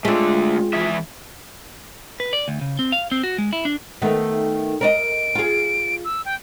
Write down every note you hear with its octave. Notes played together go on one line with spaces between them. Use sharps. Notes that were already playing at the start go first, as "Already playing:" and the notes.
G#3 A3 C4 D4 F4
E3 G#4 E5
B4
D5
D2
C#3
C4
F5
C4
F#4
G#3
E4
D4
D#3 A3 B3
A#4 D5 D#5 D7
F4 G#4
E6
G5